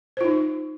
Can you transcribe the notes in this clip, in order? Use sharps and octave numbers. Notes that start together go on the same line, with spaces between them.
D#4 F4 C5